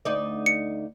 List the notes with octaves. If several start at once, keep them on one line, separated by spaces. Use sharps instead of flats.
D2 D#4 D5
C#7